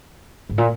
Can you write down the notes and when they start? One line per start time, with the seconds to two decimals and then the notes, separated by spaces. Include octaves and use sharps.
0.50 G#2
0.58 A#2